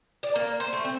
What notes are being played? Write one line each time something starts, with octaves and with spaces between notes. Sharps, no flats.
D5
A#3
C5
A3
C4